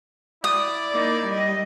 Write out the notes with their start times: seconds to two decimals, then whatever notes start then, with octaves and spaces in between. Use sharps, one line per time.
0.44 E4 D5 D#6
0.92 A#3 D#4
1.26 G3 D#5